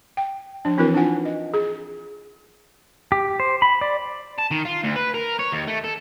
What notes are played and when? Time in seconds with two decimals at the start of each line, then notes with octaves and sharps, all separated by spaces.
0.17 G5
0.65 F3 D4
0.77 E3 C4 E4 F#4 A#4 B4
0.94 D4 D#4 F4 F#5 G#5
1.25 D#5
1.54 G#4
3.12 G4
3.40 C5
3.62 B5
3.81 D5
4.38 A5
4.51 D#3
4.65 F4
4.84 D2
4.96 B4
5.14 A#4
5.39 C#5
5.52 D#2
5.68 A3
5.84 A4